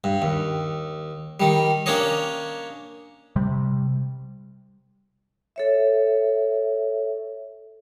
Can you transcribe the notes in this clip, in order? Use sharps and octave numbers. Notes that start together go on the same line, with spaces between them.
G2
D#2
D#3 G3
A#3 C#4 D4 C#5 D#5
C3 G3
A4 C#5 E5